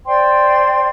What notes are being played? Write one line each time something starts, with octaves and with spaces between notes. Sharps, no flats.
C5 D5 G5 C6